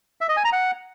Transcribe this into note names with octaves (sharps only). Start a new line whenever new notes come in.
E5
D#5
G#5
A#5
F#5